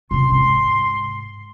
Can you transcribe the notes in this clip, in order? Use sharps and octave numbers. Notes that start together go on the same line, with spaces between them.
C#2 C3 C6
G#2